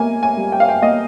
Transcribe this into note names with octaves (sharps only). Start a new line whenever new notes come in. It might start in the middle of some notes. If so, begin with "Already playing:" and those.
Already playing: A#3 G#5
G#5
G3
G5
F5
G5
A#3 D#5